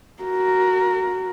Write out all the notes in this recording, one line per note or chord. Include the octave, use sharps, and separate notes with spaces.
F#4 A#4